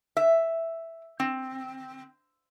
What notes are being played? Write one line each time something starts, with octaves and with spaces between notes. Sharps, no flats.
E5
C4